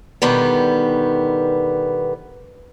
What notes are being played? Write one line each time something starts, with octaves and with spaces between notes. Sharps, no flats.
B2 D3 D#3 G3 B3